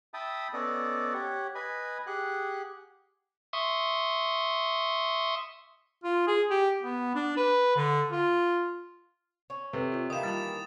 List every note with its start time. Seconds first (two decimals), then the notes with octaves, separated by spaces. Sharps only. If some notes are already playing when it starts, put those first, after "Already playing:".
0.14 E5 G5 A5 B5 D#6
0.53 B3 C#4 A4 D5 D#5
1.13 G4 C#5 F#5
1.55 B4 D#5 G#5 B5
2.07 G4 G#4 F#5 F#6
3.53 E5 C6 C#6 D#6
6.04 F4
6.27 G#4
6.51 G4
6.82 B3
7.15 D4
7.37 B4
7.76 D3
8.11 F4
9.50 C#4
9.73 C3 A4 B4
9.92 F4 C#5
10.10 D#3 E3 A#3 G4 D#6 E7
10.23 G3 F4 A5 A6